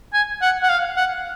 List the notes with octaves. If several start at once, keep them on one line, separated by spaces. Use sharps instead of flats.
G#5
F#5
F#5
F5
F#5